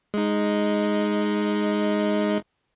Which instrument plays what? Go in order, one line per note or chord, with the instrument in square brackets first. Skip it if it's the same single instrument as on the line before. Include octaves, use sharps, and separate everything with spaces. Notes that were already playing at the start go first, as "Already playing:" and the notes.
[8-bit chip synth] G#3 D#4